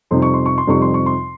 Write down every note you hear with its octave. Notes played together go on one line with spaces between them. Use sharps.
F2 C3 G3 C4 D#4 C6
C#6
C6
C#6
C6
F2 C3 G3 C4 D#4 C#6
C6
C#6
C6